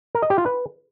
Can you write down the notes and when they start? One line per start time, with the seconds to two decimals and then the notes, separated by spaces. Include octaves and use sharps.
0.15 A#4
0.22 D#5
0.30 G4
0.38 F4
0.46 B4